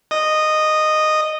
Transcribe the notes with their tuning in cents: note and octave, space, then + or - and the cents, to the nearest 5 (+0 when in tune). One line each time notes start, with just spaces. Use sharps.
D#5 -10